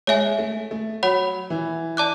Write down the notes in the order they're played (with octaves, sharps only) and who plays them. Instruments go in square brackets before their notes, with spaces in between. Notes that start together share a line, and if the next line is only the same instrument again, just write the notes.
[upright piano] G#3 [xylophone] C#5 E5 G#5
[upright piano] A3
A3
[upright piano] F#3 [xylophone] C#5 F#5 B5
[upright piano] E3
[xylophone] D5 A5 D6 F#6